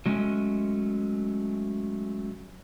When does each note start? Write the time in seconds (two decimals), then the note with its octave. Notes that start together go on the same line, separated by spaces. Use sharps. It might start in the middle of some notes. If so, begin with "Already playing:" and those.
0.06 F#3 G#3 A3 C4 C#4